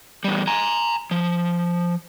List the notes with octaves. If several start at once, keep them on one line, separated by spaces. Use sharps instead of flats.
E2 G3
G#5 A#5
F3